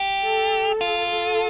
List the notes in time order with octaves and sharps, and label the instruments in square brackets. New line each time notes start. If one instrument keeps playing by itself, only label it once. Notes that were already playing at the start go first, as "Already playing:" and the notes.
Already playing: [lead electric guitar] G4
[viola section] A4
[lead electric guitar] F4
[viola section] A4